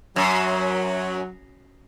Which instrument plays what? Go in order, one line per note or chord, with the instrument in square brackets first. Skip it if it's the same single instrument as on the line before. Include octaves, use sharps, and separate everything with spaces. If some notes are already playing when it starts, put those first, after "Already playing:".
[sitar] F#2 [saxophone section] F#3